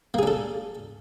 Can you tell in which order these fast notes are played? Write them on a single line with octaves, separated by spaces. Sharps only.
A#3 G#4 D4 A4